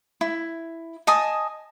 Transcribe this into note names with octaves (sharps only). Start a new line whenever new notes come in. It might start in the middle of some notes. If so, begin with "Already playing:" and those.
E4
D#5 G#5 A5 D#6